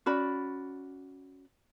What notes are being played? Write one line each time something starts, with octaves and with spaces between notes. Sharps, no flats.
C#4 F#4 D5 B5